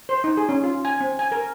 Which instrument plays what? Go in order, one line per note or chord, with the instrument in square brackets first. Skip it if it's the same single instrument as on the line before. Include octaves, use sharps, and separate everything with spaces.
[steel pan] C5
D#4
G#4
C#4
F4
G#5
C4
G#5
A#4